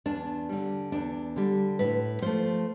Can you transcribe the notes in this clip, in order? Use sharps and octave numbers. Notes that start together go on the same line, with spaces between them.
E2 D4
D3 G3
E2 D4
D3 G3
A2 B4
F3 A3 C5